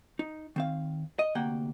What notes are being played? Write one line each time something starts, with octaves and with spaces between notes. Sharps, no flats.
D#4
D#3 C4 F5
D#5
D2 C3 A#3 F#5 G5